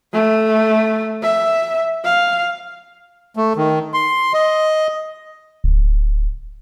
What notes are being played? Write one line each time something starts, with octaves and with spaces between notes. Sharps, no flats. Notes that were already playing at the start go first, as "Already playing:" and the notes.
A3
E5
F5
A3
D#3
C6
D#5
D1